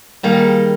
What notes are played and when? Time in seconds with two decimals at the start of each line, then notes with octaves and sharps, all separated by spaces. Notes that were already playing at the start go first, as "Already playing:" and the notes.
0.23 D#3 G3 A#3 D#4 G#4